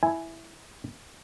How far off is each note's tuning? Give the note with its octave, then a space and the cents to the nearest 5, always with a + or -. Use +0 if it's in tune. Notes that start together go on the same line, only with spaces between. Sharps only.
E4 +0 G#5 +0